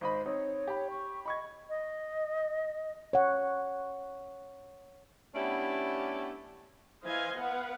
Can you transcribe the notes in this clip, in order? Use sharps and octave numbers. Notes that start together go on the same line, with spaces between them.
G#1 C5 D#5 B5
C4 D#4 C#5
G4 B5
C#6
D#5 B5 C#6 G#6
D#5
C#5 F#5
A3 B3 C#4 D4 E4 G4
E3 C5 D#5 F5 G#5 C6
B3 B4 F5 F#5